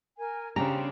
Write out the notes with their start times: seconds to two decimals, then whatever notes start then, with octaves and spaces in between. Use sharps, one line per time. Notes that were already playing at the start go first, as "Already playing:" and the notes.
0.18 A#4 G#5
0.56 C#3 D4 G4 C5 A#5